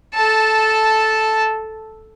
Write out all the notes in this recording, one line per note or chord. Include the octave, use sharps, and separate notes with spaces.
A4 A5